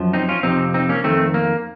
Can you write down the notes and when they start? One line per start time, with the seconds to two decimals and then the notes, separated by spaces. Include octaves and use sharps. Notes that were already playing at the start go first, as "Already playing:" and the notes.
Already playing: F#2 F3
0.13 C4 D#4
0.29 C#4 F4
0.43 F2 C3 F3 C4 D#4
0.74 C4 D#4
0.89 A#3 C#4
1.04 F2 D#3 A3 C4
1.34 A#3